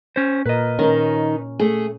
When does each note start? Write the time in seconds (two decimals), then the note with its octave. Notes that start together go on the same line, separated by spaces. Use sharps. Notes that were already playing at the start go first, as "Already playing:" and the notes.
0.16 C#4 C5
0.46 A#2 A#4 B4 D#5
0.79 D#3 C#4 D#4
1.59 A3 G#4